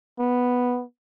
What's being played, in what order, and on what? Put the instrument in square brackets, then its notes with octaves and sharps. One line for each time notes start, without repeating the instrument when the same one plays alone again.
[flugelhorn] B3